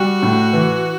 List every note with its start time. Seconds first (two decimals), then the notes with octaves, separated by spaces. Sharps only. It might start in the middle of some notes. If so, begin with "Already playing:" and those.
Already playing: G3 F#4
0.23 A2
0.53 E3